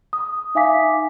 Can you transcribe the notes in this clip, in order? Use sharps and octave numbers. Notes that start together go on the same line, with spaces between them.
D#6
D#4 E5 F5 G#5 D6 B6